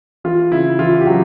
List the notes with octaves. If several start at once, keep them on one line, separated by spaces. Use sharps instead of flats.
E3 F4
C#3 E4
E3 F4
G4
C#3 F#3 F#4